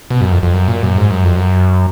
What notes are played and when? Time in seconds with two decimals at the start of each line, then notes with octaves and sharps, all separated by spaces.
0.10 B2
0.21 F#2
0.32 F2
0.43 F2
0.53 F#2
0.68 A#2
0.83 F#2
0.98 G#2
1.11 F#2
1.24 F2
1.36 F#2